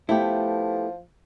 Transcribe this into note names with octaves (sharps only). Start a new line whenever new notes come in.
F3 A3 B3 E4 G4